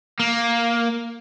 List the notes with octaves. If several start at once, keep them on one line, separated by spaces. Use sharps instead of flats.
A#3